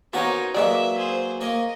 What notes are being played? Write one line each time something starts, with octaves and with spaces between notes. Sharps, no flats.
A#3 B3 C#4 D#4 F#4 A#4 C5 C#5
F#3 G#3 A#3 B4 D5 E5
G#4 C5
A#3 C#5 D#5